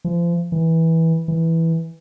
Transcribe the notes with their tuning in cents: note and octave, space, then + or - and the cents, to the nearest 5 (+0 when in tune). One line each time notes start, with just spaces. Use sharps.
F3 -35
E3 -15
E3 -5